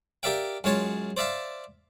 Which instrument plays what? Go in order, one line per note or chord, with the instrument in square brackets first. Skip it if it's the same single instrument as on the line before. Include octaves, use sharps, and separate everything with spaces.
[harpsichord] G4 A#4 D5 E5 F5 G5
F#2 G#3 F4 C#5 A5
C5 D5 E5 F5 A5